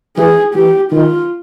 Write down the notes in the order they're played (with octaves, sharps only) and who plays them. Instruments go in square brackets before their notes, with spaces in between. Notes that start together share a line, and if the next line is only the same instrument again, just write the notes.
[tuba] E3 [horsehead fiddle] G#4
[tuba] E3 [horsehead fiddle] G4
[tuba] D#3 [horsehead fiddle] F4